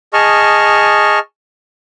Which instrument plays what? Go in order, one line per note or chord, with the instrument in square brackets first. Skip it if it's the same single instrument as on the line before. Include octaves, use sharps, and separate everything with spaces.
[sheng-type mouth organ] G#4 D#5 A5 C#6 F6